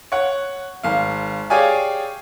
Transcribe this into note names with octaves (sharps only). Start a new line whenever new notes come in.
C#5 F#5
G#1 F5
G4 G#4 C#5 D5 F5 G#5